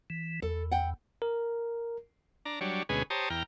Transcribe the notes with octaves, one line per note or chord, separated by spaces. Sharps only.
E3
E2 A4
F#5 G5
A#4
D4 A#5
F#3 G3 D4 C#5
D2 B2 G#3 C#4 G#4 B4
G4 C5 C#5 A5 A#5 D#6
E2 G5 A#5 F6